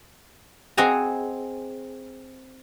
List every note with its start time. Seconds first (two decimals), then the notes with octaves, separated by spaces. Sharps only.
0.77 C4 G#4 D#5 F#5 G#5 A#5